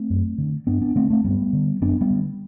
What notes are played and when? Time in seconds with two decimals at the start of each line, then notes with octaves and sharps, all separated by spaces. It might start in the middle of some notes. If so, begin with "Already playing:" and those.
Already playing: A3 C4
0.10 F#2
0.38 D3
0.67 G2 B3 D4
0.81 B3 D4
0.96 D3 A3 C4
1.10 A3 C4
1.24 G2 G3 B3
1.53 D3
1.81 F#2 B3 D4
2.01 G3 B3
2.10 D3